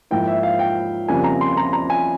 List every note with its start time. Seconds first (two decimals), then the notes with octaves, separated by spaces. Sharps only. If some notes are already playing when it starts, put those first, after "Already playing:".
0.11 G#2 F3 A#3 E4 G5
0.27 E5
0.43 F5
0.59 G5
1.08 F2 C#3 G3 A#3 G#5
1.24 A#5
1.41 C6
1.57 A#5
1.73 A#5
1.90 G#5